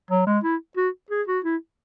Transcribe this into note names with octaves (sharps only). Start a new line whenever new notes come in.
F#3
G#3
E4
F#4
G#4
F#4
E4